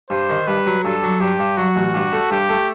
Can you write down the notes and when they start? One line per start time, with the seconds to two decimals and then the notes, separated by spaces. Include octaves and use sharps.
0.10 G2 C5
0.30 D#3
0.47 G2 B4
0.66 F#3
0.84 G2 A4
1.03 F#3
1.20 G2 G4
1.39 G2
1.57 F#3 F#4
1.76 A1
1.94 G2
2.12 A3
2.31 G2 G4
2.49 A3